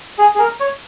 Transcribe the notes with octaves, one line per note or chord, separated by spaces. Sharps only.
G#4
G#4
A#4
C#5